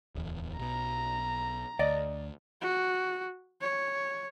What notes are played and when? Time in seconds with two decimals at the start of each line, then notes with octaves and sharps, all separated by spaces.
0.15 D1 E2
0.59 B1 B2 A#5
1.79 D2 D5 D#5
2.62 F#4
3.62 C#5